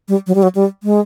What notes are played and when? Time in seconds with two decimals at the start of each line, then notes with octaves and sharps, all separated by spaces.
0.08 G3
0.27 F#3
0.35 G3
0.43 F#3
0.55 G3
0.83 G#3